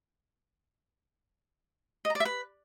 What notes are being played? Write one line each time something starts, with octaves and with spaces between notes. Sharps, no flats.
D#5
A#5
D5
E5
B4